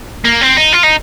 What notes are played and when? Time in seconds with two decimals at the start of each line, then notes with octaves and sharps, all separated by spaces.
0.25 A#3
0.42 C4
0.57 D#4
0.73 F4
0.84 D#4